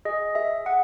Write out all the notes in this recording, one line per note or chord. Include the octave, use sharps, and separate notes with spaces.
G#4 D#5
G#4 E5
G#4 F#5